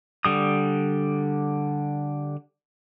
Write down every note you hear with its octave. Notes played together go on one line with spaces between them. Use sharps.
D3 G3 D#6